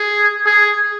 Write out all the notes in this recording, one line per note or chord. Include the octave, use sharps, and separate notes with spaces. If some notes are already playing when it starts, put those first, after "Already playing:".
Already playing: G#4
G#4